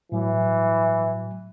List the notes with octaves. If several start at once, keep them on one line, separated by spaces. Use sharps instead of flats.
A2 E3 F#3